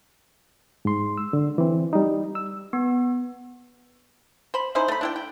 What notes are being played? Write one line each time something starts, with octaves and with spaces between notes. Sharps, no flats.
G#2 C6
E6
D3
E3 C4
G3 D#4
E6
B3
C5 B5
C#4 D#4 E4 C5
A3 B5
D4 E4 G5
G5